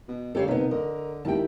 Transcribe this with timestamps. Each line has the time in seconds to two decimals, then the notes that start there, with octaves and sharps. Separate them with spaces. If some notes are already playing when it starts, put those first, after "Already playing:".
0.08 B2
0.35 C#2 D3 G4 A4 C#5 F5
0.48 G1 C3 B3 D#4 A#4
0.71 D3 A#4 D#5
1.25 E1 D#3 E4 G4 G5 A5